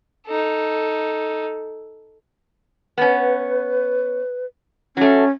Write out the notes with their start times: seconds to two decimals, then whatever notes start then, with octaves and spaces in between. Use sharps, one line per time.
0.27 D#4 A4
2.98 B3 C#4 B4
4.97 F#3 A3 C#4